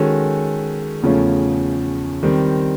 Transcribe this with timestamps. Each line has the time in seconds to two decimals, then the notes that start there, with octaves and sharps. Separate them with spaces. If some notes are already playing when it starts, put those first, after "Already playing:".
Already playing: D#3 G#3 C#4 F#4 A4
1.02 E2 C#3 F3 A3 C#4
2.23 D#3 G3 C4